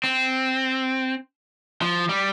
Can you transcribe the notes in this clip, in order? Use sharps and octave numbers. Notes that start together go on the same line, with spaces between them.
C4
F3
G3